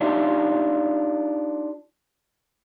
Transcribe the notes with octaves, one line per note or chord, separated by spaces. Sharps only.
D4 D#4 F4 G4 E5